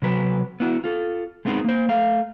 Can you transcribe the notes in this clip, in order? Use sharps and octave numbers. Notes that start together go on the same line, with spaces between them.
C3 F#3 B4
B3 E4 F#4
F4 A4
G#3 A3 B3 C4 D#4 G#4
A#3 C5
A3 F5